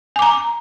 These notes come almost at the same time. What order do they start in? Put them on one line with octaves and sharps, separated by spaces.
G#5 D6 A#5